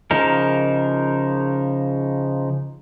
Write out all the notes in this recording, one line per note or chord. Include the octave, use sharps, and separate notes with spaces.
C#3 F3 D#4 A#4